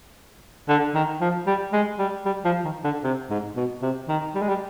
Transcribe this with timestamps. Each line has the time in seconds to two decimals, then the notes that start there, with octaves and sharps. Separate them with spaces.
0.69 D3
0.95 D#3
1.21 F3
1.47 G3
1.73 G#3
1.99 G3
2.26 G3
2.45 F3
2.65 D#3
2.84 D3
3.04 C3
3.30 G#2
3.56 B2
3.82 C3
4.09 D#3
4.35 G3
4.42 G#3
4.49 G3